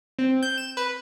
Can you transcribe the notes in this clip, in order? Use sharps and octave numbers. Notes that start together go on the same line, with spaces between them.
C4
G6
E7
B4